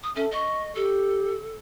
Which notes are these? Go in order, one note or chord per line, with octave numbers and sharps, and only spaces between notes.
D#6
C#4 A4 E5
D#5 C#6
G4 A4